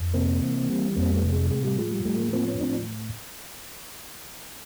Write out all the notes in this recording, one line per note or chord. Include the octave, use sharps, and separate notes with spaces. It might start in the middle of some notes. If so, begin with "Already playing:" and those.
Already playing: F2
C3 A#3 C4
E3
G3
F2 A#3 C4
A3 B3
C3
G#3
A2 G#3
G3
F3 G#3
G3
A2 G3 A3
G#3 A#3
F3 A#3 C4
B3 C#4
A2 C4 D4